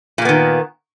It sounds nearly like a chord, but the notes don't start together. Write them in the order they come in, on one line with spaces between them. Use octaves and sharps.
A#2 A#3 B3 D#3